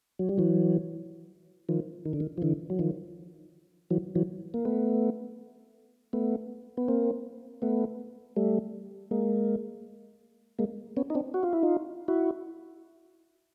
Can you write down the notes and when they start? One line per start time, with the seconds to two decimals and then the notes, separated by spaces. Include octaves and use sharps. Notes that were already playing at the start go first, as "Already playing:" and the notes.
0.19 F#3
0.29 G3
0.38 E3 F#3
1.69 D#3 F3
2.06 D#3
2.13 D3
2.20 D#3
2.38 F3
2.42 D3 E3
2.70 F#3
2.79 D#3 F3
3.90 E3 F#3
4.15 E3 F#3
4.54 A#3
4.65 A3 B3
6.13 A3 B3
6.77 B3
6.88 A#3 C4
7.62 A3 B3
8.36 G3 A3
9.11 G#3 A#3
10.59 G#3 A#3
10.97 B3 C#4
11.10 D#4
11.15 C4 D4
11.34 F#4
11.43 F4
11.53 E4
11.63 D#4 F4
12.08 E4 F#4